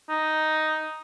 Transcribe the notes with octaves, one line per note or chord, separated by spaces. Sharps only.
D#4